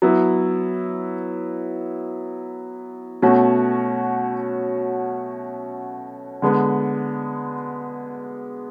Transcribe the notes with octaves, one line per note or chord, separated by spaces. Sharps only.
F#3 B3 E4
B2 A3 C#4 F#4
D3 G#3 B3